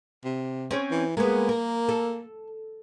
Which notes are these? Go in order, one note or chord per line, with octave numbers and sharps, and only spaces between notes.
C3
C4 C#4 C#5
E3
G#3 A#3 B3
A#4
A4